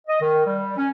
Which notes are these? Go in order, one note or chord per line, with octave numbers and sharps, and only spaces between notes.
D#5
D#3
G3
C#4